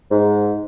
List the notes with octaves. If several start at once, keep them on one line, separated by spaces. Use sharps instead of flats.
G#2